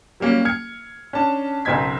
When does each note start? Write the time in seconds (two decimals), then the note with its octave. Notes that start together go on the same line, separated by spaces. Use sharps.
0.20 F#3 G3 A#3 C#4
0.45 F6 G#6 C#7
1.13 C#4 D4 A5
1.65 F#1 B1 C4 D#4 G#6 B6